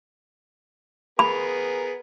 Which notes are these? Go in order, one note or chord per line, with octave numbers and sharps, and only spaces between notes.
B3 G#4 A#4 B5